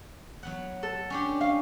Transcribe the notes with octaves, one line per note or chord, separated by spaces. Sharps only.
F#3 B3 F#5
A4
C#4 D4 G4
C#4 F5